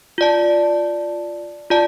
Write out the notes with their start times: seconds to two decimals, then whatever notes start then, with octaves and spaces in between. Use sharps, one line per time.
0.18 F4 D5 A5
1.70 F4 D5 A5